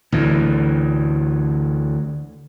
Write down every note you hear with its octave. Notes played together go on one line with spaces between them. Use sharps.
D2 A2 E3